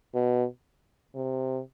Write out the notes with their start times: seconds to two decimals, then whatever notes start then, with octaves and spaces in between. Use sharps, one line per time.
0.14 B2
1.15 C3